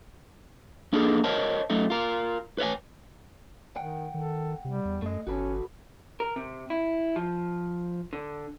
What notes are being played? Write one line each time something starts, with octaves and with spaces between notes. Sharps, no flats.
A#3 B3 D4 D#4 G#4 A4
A#4 C5 C#5 D#5 A5
F#2 A3 D#4
F4 A#4
B4 C#5 E5 G#5
D#3 F#5 G5
D#3 A4
C3 G3
E2
F#2 A3 D#5
G1 C#4 F#4 A4 B4
A#4
C3
E4
F3
D3